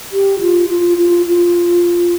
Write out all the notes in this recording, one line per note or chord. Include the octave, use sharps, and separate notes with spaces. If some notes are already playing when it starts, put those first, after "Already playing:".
G4
F4
F4
F4
F4